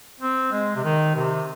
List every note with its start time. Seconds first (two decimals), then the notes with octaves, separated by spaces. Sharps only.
0.20 C4
0.51 G#3
0.76 C3
0.84 D#3
1.15 C3